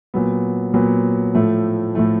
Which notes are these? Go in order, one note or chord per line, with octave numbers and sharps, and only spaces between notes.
A#2 F#3 B3
A#2 F#3 B3
A2 F3 A3
A2 F3 A3